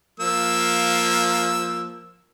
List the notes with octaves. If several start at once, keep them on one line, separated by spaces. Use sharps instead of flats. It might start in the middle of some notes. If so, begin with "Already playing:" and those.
F3 A#3 E6